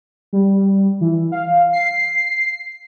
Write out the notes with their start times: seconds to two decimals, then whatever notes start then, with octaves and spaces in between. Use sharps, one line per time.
0.33 G3
1.01 E3
1.32 F5
1.73 C7